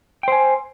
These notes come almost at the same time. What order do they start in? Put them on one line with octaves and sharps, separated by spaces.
G5 C5 G#5